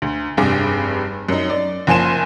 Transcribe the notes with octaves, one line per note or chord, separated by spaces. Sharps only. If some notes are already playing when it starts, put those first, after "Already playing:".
D2
F1 G2 G#4 D6
F#2 D#4
D5
F#1 F3 G#5 C6 E7